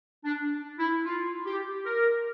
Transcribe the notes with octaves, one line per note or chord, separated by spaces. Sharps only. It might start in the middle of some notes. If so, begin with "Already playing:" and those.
D4
E4
F4
G4
A#4